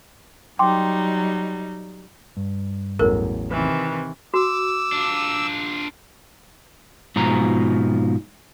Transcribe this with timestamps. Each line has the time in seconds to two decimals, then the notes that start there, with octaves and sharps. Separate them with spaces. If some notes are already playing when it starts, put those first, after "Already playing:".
0.59 F#3 G3 D#4 G5 C6 D6
2.37 G2
2.99 A1 E2 F#3 A4 A#4
3.51 C3 D#3 E3 B4 B5
4.34 F#4 D6 E6
4.92 D4 F4
7.16 G#2 B2 F3 A#5